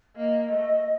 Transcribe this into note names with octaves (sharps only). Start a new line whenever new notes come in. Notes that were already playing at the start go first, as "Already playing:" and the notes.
A#3 D#5
A3